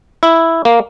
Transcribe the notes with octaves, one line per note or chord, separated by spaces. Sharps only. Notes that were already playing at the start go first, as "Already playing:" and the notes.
E4
A#3